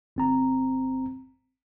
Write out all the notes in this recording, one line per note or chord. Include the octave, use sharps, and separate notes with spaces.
G1 C4 A#5